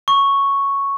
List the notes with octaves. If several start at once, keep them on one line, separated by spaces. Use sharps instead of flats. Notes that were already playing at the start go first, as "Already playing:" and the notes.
C#6